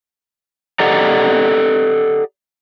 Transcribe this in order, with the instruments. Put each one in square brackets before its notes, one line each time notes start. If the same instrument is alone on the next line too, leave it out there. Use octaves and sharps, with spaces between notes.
[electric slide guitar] G4 A4 D5 D#5 F#5 A#5